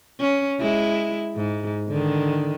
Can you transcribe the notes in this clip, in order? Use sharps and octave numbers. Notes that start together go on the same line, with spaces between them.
C#4
G#3 E4
G#2
D3 D#3